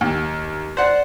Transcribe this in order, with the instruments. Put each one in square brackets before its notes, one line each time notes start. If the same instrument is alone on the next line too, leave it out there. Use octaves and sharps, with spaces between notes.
[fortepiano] D#2
[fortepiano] C5 F#5 [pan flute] D5